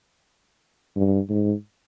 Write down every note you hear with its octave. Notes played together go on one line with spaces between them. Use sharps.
G2
G#2